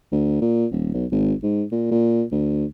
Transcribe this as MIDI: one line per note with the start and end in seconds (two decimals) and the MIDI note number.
0.12 0.40 38
0.41 0.66 46
0.71 0.91 27
0.94 1.06 35
1.12 1.33 32
1.43 1.64 44
1.72 1.90 46
1.91 2.24 46
2.32 2.65 38